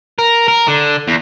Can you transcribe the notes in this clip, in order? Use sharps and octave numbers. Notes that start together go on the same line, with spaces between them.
A#4
A#4
D3
E2